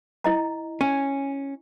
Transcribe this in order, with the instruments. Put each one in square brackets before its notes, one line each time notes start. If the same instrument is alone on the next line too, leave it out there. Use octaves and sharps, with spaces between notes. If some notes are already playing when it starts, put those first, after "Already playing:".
[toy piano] E4 D#5 A#5
[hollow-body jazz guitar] C#4 [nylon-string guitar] G#5